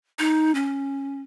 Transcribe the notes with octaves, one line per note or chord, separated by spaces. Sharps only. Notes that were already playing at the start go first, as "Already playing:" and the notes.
D#4
C#4